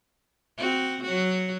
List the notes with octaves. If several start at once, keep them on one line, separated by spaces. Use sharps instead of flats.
C4 F#4
F#3 F#4